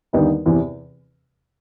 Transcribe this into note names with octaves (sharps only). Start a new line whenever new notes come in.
D#2 D3 G3 B3 D#4
E2 C3 E3